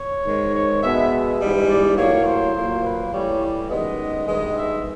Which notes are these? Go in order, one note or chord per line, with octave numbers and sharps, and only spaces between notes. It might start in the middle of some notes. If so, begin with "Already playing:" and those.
Already playing: C#5
G#2 D#3 G#3
C#5
B2 G#3 B3 E5
G#2 E3 G3 B3
D5
A2 F#3 A#3 C#5
C5
A#2 F#3 A#3
B4
A2 E3 G3 C#5
D5
F#2 D#3 G#3 B3 D#5
G2 D#3 G#3 B3
E5